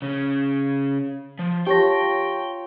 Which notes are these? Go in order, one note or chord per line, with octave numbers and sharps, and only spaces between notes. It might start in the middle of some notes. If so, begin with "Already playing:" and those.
C#3 C#4
F3
F4 G4 C#5 G5 A5 A#6